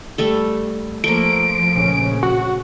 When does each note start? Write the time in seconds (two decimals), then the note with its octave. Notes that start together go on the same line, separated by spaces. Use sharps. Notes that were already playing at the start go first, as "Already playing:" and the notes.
0.18 G3 A3 A4
1.04 F3 A3 A#3 D7
1.73 A#1 C#3 C#4
2.23 F#4